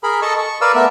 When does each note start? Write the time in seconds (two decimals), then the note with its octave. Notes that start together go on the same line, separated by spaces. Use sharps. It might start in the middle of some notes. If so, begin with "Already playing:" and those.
0.03 G#4 A#4 B5
0.22 A4 D#5 A5 C#6
0.38 C#6
0.61 A#4 B4 D5 F5 E6
0.75 A3 B3 A#4 E5